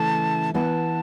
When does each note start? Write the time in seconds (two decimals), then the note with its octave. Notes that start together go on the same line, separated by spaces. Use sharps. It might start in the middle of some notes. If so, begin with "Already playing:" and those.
Already playing: C#3 E3 A3 A5
0.54 E3 B3 E4 B4 A5